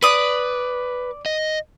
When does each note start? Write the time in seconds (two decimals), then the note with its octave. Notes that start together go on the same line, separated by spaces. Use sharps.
0.03 B4 D5 D#6
1.26 D#5